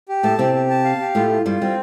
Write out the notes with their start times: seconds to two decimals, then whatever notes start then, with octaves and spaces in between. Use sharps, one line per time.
0.09 G4
0.23 A2 A3 A5
0.38 C3 C4 G4
0.54 G4
0.70 A5
0.85 F5
1.00 G4
1.15 A2 A3 F4
1.30 F4
1.46 G2 G3 F4
1.61 G3 C4